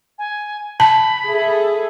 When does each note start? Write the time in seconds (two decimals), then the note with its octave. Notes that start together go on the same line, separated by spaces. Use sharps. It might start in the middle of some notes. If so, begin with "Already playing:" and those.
0.18 G#5
0.80 A5 B5
1.28 G#4 A4 E5